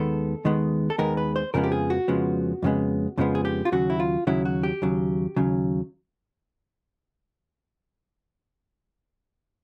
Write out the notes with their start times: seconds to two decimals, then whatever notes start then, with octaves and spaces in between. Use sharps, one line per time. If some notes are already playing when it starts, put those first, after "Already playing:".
Already playing: D#2 D#3 G#3 B3 A4
0.45 D#2 D#3 G#3 B3
0.90 A4
0.98 D#2 D#3 G#3 B3 A#4
1.17 B4
1.36 C5
1.54 F2 C#3 F3 G#3 B3 A#4
1.64 G4
1.72 G#4
1.90 F#4
2.08 F2 C#3 F3 G#3 B3
2.63 F2 C#3 F3 G#3 B3
3.18 F2 C#3 F3 G#3 B3
3.35 G#4
3.45 G4
3.65 F4
3.72 D#2 C#3 F#3 F#4
3.90 E4
4.00 F4
4.27 D#2 C#3 F#3 E4
4.45 F#4
4.63 G4
4.82 D#2 C#3 F#3
5.36 D#2 C#3 F#3